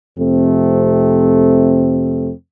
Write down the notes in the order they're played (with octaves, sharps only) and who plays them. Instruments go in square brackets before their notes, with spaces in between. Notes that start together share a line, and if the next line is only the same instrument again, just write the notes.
[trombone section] F2 C3 A3 C4